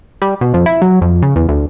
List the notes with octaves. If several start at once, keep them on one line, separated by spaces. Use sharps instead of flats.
G3
B2
F2
E4
F#3
F2
C#3
E2
D2